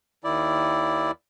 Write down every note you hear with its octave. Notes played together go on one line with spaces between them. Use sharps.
D#2 D#3 E4 D5